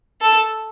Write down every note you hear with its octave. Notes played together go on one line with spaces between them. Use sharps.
A4